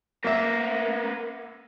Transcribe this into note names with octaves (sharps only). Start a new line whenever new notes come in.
A#3 B3 A#4 E5